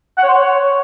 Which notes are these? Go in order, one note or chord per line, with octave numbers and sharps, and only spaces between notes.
F#5
C#5
C5
C#5